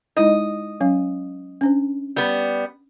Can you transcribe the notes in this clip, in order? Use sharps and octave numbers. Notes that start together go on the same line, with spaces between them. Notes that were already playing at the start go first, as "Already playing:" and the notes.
G#3 D#4 E4 D#5
F#3 C#4 F5
C#4 D4 C5
G3 B3